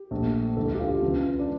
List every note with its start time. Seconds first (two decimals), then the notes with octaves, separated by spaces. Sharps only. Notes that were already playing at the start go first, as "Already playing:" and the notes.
Already playing: G4
0.11 A#1 A#2 A3
0.57 E1 D2 D3 A4
0.75 G4
0.79 F4
1.02 C#2 C#3 E3
1.39 D4